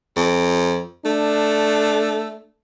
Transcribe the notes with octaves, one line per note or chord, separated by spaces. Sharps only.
F2
A3 D4